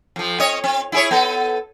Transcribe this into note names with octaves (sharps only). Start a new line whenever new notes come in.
F2 F3
C4 C#5 D#5
C4
E4 G#4 C#5
B3 A4